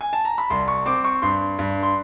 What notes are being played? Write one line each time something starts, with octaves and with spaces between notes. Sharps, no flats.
G#5
A5
A#5
B5
C2 C6
C#6
C4 D6
C#6
G2 C6
G2
C6